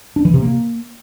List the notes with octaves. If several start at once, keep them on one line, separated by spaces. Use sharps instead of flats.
D4
E3
C3
A#3